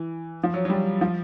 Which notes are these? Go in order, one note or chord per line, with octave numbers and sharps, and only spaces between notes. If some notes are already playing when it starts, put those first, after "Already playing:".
Already playing: E3
F3
F#3
F#3
G3
F3